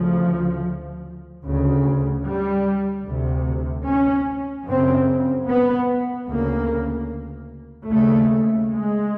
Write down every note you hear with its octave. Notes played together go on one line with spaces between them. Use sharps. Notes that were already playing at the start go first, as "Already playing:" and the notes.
Already playing: D2 C#3 F3
D2 C#3
G3
D2 C3
C#4
F#2 C#3 C4
B3
D2 C#3 A#3
D#2 C#3 A3
G#3